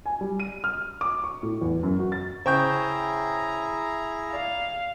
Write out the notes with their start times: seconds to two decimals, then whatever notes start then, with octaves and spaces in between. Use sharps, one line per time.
0.06 G#5
0.21 G3
0.40 D#7
0.64 F6
1.01 D6
1.24 C#6
1.43 A2
1.61 E2
1.83 F#2
1.99 F#4
2.12 A6
2.46 C#3 E4 G#4 C5 G5 A#5 C#6 G6
4.33 D5 F5